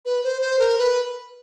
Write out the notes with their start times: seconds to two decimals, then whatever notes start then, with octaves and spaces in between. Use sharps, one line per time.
0.05 B4
0.23 C5
0.41 C5
0.59 A#4
0.78 B4